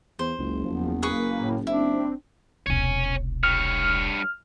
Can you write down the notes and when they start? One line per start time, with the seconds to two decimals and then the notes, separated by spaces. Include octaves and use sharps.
0.19 E2 C5
0.39 F#1 C#2
0.65 E2 F3
1.03 A#3 G#4 B4 C#6
1.38 A2
1.67 C4 D4 E4
2.66 E1 C2 C#5 G#5
3.43 G2 C#5 F6